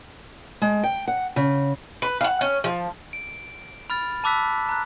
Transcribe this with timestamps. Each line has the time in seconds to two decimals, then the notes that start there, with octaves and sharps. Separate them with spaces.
0.62 G#3
0.83 G5
1.08 F#5
1.36 C#3
2.02 B4
2.21 F5 F#5
2.41 C#4
2.64 F3
3.13 D7
3.90 B5 F6 A6
4.24 A5 B5 D6 E6 F#6 B6
4.69 A#5 F#6